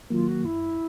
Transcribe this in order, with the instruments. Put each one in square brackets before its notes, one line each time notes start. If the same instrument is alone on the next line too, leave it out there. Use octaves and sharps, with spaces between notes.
[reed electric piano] D#3 F#3 A#3 [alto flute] F4
[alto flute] F#4
[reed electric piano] F#2 [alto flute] E4